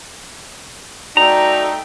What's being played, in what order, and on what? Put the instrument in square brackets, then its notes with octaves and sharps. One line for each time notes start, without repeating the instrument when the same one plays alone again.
[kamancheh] A3 G5 [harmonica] D#4 [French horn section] F#4 D5 [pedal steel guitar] A#5